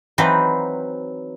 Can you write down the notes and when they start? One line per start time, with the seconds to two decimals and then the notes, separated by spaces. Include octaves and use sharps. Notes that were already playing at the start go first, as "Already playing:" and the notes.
0.18 E3 F#3 C4 D#4 B4 C5